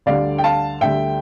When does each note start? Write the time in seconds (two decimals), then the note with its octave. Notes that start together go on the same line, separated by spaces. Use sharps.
0.06 D2 D3 G3 D5 F5
0.38 G5
0.44 F5 A5
0.81 D2 D3 G3 E5 G5